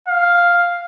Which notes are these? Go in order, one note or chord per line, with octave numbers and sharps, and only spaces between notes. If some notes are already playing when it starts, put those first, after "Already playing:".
F5